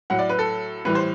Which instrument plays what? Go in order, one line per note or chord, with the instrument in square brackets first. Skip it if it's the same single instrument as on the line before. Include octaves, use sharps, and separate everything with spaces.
[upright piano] A2 F#3 F#5
D5
B4
A4
A2 E3 G3 B4
C5